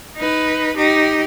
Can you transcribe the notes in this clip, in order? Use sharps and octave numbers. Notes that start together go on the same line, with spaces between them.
D#4 B4
D#4 G4